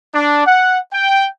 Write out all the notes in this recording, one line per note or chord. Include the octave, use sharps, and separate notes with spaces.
D4
F#5
G5